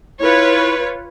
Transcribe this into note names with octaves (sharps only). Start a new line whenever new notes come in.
E4 F4 B4 C#5